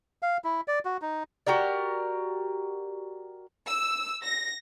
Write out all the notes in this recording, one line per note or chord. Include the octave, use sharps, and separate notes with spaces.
F5
E4
D5
F#4
D#4
F#4 G4 A#4 D5
E6
A#6